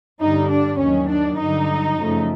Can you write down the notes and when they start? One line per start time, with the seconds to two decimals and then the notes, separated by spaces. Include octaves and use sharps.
0.20 G2 D3 G3 D#4
0.49 D4
0.79 D#2 D#3 F#3 C#4
1.09 D4
1.38 G2 D3 F#3 D#4
1.98 F#2 C#3 F3 A3